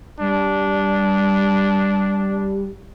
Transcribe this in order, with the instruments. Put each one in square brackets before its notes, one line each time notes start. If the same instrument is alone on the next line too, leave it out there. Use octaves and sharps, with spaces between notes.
[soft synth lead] G3 [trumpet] D4